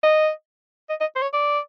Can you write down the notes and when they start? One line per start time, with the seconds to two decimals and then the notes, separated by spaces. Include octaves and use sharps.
0.03 D#5
0.90 D#5
1.00 D#5
1.16 C5
1.22 C#5
1.33 D5